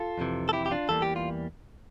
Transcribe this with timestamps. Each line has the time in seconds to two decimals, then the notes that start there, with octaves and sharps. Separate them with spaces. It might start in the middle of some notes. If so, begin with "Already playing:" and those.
Already playing: F4 A4
0.18 F2 C3 E3
0.49 A4
0.53 E4 G4
0.66 G4
0.71 D4 F4
0.89 E2 E3 G3 A#3 A4
1.02 G4
1.16 F4